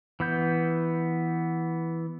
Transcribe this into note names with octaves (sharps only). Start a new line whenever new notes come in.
E3 B3 G6